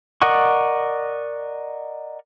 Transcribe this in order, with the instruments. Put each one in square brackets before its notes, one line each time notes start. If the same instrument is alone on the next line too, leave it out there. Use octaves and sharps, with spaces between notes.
[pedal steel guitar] A#4 D5 D#5 F#5 C#6